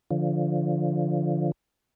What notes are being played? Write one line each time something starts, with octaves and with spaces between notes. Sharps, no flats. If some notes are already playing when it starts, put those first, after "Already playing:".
D3 F3